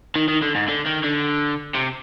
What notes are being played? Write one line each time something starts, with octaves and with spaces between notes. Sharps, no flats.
D#3
D#3
D3
G#2
D3
D#3
D3
C3